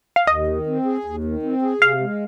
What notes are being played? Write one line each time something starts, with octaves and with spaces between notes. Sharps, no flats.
F5
D#2 D#5
D#3
C4
G#4
D#2
D#3
C4
G#4
C3 F5
G#3